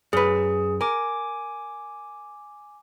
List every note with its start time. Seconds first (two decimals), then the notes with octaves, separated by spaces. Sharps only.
0.13 F#2 G#4 B4
0.81 A#4 G#5 D6